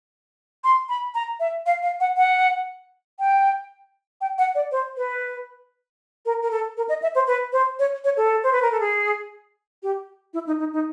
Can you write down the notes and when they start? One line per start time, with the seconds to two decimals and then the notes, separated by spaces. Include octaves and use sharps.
0.64 C6
0.89 B5
1.15 A#5
1.40 E5
1.66 F5
1.82 F5
2.00 F#5
2.17 F#5
3.20 G5
4.21 G5
4.38 F#5
4.55 D5
4.72 C5
4.97 B4
6.26 A#4
6.43 A#4
6.51 A4
6.77 A#4
6.89 D#5
7.02 E5
7.15 C5
7.27 B4
7.53 C5
7.79 C#5
8.04 C#5
8.17 A4
8.43 C5
8.53 B4
8.62 A#4
8.72 A4
8.80 G#4
9.83 G4
10.34 E4
10.47 D#4
10.59 D#4
10.73 D#4